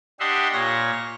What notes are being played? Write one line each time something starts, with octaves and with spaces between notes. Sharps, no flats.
D4 G4 D#5 E5 F#5 C6
A#2 C#5 A#6